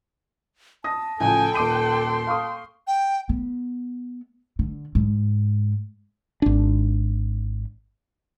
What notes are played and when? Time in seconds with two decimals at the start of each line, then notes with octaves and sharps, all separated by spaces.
0.84 A5 D#6 A#6
1.20 A1 C#3 F3 A4 G5 G#5
1.55 D#1 C6 D6 D#7
2.27 F5 C#6 D#6
2.87 G5
3.29 B3
4.59 D3
4.95 G#2
6.42 G#1 D4